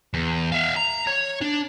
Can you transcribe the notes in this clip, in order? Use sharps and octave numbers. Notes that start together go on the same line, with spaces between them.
E2
E5 F5
A#5
C#5
D4